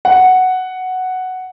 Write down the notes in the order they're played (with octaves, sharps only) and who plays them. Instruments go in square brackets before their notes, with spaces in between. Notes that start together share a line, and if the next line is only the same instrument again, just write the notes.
[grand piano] F#5